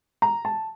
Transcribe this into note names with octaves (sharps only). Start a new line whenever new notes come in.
A#5
A5